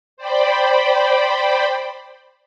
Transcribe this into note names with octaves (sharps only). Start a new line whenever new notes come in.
C5 D5 G5 B5